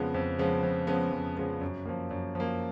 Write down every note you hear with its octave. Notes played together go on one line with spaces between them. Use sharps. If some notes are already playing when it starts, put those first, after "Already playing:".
Already playing: F2 C#3 F3 G#3 B3
F2
C#3 F3 G#3 B3
F2
C#3 F3 G#3 B3
F2
C#3 F3 G#3 B3
F#2
F3 A#3
F#2
F3 A#3